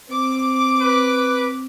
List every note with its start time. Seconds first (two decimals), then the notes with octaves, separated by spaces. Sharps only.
0.11 C4 D6
0.81 B4